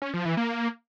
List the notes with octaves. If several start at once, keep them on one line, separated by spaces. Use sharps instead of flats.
C#4
F3
E3
A#3